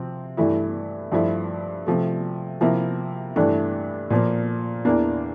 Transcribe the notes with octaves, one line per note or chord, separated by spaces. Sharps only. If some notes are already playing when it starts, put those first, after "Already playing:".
Already playing: C3 F3 C4
G2 E3 A3 E4
G2 F3 A3 E4
C3 F3 A3
C3 F3 A#3 E4
G2 E3 A3 D4
A#2 F3 A#3
E2 E3 A#3 D4